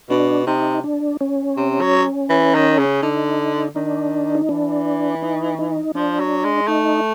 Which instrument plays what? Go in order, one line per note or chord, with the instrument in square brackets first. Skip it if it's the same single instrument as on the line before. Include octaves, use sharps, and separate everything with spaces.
[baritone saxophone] B2 [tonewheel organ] D4
[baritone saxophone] C3 [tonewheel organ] D#4
[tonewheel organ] D4
C#4
[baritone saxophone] C3
F#3
E3
D#3
C#3
[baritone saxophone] D3 [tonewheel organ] D#4
[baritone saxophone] D#3 [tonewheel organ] D4
[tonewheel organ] D#4
[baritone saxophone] E3 [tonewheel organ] D4
[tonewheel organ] D#4
D#4
[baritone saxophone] F3 [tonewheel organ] D4
[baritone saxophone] F#3
G#3
[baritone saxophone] A3 [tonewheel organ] D#4